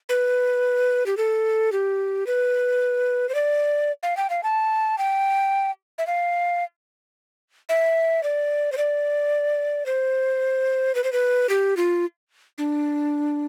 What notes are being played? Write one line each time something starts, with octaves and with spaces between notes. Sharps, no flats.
B4
G4
A4
G4
B4
C5
D5
F5
G5
F5
A5
G5
E5
F5
E5
D5
C5
D5
C5
B4
C5
B4
G4
F4
D4